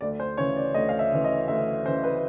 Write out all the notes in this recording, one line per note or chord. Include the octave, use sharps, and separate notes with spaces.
D2 D5
C5
C#3 E3 C#5
D5
D2 D#5
F5
E5
C#3 E3
D#5
D2 E5
C#3 E3 C5
B4